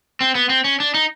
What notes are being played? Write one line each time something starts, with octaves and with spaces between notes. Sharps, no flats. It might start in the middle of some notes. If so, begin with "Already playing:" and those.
C4
B3
C4
C#4
D4
D#4